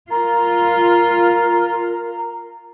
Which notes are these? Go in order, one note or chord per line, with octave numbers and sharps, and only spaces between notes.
F4 A#4 A#5